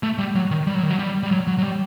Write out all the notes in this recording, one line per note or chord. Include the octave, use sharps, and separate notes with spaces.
A3
G3
F#3
D#3
G3
F#3
D#3
F#3
G3
G3
F#3
F#3
F#3
G3